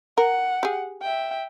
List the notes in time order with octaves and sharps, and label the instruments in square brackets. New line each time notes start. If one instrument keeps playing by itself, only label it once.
[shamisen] A#4 [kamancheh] F#5
[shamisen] G4 G#4
[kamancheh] E5 G5